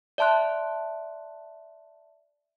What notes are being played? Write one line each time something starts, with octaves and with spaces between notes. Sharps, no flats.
D5 E5 A5 C6 F#6